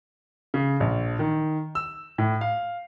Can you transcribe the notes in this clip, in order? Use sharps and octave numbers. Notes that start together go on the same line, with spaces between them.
C#3
A#1
D#3
E6
A2
F5